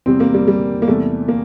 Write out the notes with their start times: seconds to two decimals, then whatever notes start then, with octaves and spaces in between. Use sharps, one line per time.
0.06 E2 C3 G3 C4
0.20 A#3
0.34 G3
0.48 G3
0.82 A#3
0.87 E2 C3 G3 A3
1.28 A#3